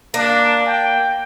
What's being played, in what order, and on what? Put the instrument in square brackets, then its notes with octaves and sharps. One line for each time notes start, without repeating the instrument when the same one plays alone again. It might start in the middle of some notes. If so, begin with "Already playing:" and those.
[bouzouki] A#3 [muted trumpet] D4
[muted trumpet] G5